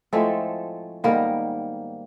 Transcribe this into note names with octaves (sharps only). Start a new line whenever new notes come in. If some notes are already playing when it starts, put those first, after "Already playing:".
A2 F3 G#3 A3 C4 A4
G#2 D#3 G3 A#3 B3 A#4